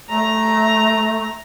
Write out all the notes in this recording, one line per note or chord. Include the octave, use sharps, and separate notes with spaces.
A3 A#5